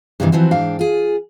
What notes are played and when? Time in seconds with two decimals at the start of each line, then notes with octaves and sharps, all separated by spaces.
0.20 G2 C3 D#3 E3
0.32 E3 F3 C4 F#4
0.51 G#2 D4 F5 G5
0.79 F4 G#4